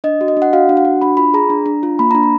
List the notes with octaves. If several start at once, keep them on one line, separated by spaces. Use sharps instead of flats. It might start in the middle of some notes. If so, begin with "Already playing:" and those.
D4 D#5
F#4
D#5
D4
F#5
F#4 F5
D4
F#5
F#4
D4 B5
F4 B5
G#4 A#5
D4
D4
F4
A#3 B5
D4 A#5
B5